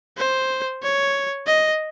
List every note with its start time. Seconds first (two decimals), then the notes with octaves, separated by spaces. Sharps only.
0.18 C5
0.83 C#5
1.47 D#5